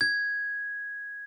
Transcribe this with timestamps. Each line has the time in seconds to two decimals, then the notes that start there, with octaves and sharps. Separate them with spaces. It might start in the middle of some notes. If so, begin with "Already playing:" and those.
0.01 G#6